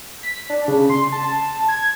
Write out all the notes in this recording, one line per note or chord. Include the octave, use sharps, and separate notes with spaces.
B6
D4
C#3
C6
A5
G#6